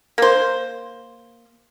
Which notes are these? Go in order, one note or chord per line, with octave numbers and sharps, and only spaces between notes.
A#3 C5